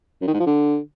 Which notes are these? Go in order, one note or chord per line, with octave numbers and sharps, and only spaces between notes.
F#2
D#3
G#2
F3
D3